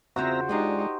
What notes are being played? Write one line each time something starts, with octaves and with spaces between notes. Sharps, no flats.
E2 C#3 C4 F4 F#4 C5 E5 A#5
E2 G#3 D4 D#4 F4 G4